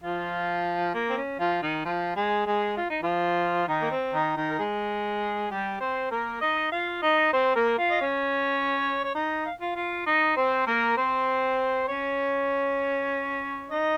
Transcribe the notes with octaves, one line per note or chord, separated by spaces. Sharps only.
F3 F4
A#3
C4
C#4
F3 F4
D#3 D#4
F3 F4
G#3 G#4
G#3 G#4
F4
D#4
F3 F4
D#3 D#4
A#3
C4
D#3 D#4
D#3 D#4
A#4
G#3 G#4
G3 G4
C4 C5
A#3 A#4
D#4 D#5
F4 F5
D#4 D#5
C4 C5
A#3 A#4
F4 F5
D#5
C#4 C#5
C#5
D#4 D#5
F5
F4 F5
F4 F5
D#4 D#5
C4 C5
A#3 A#4
C4 C5
C#4 C#5
D#4 D#5